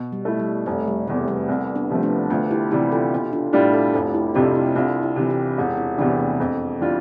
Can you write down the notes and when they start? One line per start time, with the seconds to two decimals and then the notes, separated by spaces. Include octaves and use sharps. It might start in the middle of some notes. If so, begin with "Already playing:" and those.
Already playing: B2
0.12 G3
0.25 A3 E4
0.39 G3
0.66 F1 A3
0.87 G3
1.07 E2 C3 A3
1.28 G3 B3
1.49 C2
1.75 B3 D4
1.90 C3 F3 A3
2.03 B3 D4
2.30 D2 D4 F4
2.51 E4 G4
2.71 C3 E3 G3 E4 G4
2.91 F4 A4
3.12 B1
3.33 D4 F4
3.53 A2 G3 D4 E4 F4 G4
3.73 F4 A4
3.94 F1 F4 A4
4.14 E4 G4
4.34 F2 C3 G3 D4 F4
4.55 C4 E4
4.66 E4
4.75 C2 D4 F4
5.03 E4 G4
5.16 C3 E3
5.30 E4 G4
5.58 E1
5.77 C4 E4
5.98 E2 C3 E3 G3 B3 D4
6.19 A3 C4
6.40 F2
6.81 E3 G3 D4 F4